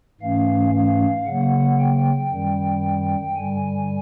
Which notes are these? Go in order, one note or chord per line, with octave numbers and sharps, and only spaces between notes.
G#2 E3 A3 C#4 F5
F5
C#3 F#3 A#3 F#5
G5
F#2 D#3 G3
G2 D3 G3 G#5